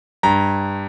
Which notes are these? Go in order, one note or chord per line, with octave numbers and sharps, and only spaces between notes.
G2 A#5